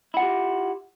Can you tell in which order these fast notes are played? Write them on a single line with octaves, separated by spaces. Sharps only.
E4 F#5 F4 G4